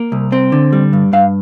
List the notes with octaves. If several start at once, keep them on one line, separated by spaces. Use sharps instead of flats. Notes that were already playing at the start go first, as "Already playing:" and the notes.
Already playing: A#3
C2
C4
D3
G3
G2
G2 F5